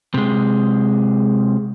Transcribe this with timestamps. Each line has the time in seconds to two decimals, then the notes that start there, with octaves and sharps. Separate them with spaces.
0.14 C3 G#3